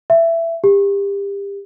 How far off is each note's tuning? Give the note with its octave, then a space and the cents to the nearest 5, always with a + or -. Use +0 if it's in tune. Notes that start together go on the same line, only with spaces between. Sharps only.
E5 +15
G4 +30